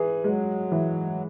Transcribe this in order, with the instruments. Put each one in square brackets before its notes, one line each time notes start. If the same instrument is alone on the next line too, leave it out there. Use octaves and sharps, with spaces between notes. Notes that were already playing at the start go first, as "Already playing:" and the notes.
Already playing: [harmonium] E3 [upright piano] G#4
[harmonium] F#3 [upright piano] G#3
[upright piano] E3